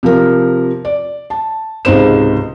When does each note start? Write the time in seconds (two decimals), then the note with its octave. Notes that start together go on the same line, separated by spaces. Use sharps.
0.03 C3 F3 A#4
0.85 D5
1.30 A5
1.85 C#2 G#2 C3 C5 E7